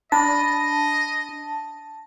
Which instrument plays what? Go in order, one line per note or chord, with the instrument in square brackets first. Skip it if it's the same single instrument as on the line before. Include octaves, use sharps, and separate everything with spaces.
[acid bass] D4 [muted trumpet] D#5 [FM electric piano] A5 [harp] B5